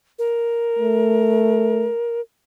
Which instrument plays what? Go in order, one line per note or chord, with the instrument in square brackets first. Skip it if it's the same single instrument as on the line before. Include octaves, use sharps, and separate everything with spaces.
[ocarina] A#4
[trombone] A3